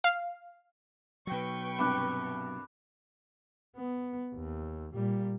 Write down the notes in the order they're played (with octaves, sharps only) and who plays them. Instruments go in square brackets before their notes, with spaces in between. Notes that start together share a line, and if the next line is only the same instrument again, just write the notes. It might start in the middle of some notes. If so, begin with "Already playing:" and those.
[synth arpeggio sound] F5
[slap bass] B2 F#3 [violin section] B4 G5 C#6
[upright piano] C2 G2 [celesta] B5 D6 F#6
[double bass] B3
D#2
A#2 G3